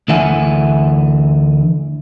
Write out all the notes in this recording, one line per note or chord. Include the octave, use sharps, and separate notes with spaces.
D2 D3 E3 E5 F#5 G#5